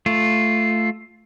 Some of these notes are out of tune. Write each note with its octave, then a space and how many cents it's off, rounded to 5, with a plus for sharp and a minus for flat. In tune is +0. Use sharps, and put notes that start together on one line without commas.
A3 +0 F4 +0